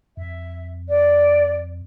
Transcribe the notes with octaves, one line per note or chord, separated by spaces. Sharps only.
F2 E5
D5